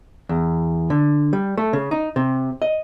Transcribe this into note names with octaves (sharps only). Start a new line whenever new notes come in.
E2
D3
G3
A3
C#3
D#4
C3
D#5